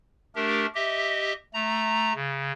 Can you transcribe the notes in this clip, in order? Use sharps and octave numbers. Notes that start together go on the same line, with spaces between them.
A3 D4 G4 A#4
G4 D#5 E5
A3 A#5
C#3